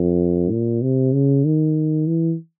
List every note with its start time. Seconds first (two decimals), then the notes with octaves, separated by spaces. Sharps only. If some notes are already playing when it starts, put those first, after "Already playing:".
Already playing: F2
0.51 A#2
0.82 C3
1.13 C#3
1.45 D#3
2.07 E3